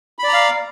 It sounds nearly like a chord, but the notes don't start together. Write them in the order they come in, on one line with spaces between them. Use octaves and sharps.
B5 D5 A#5 F5